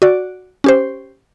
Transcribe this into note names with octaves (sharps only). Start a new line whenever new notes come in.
F#4 D5
C#4 G4 C5